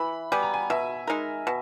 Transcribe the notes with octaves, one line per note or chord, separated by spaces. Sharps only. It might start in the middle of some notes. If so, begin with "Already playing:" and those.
Already playing: E3 B5
G3 B3 G#5
A#5
G#5
B2 E5
G#3 D#4 A#4
B2